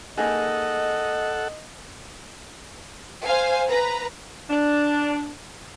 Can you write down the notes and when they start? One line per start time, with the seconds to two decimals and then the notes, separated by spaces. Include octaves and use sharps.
0.18 A#3 D#4 G#4 A4 D#5 F#5
3.23 C5 F5 G#5
3.68 B4 A#5
4.50 D4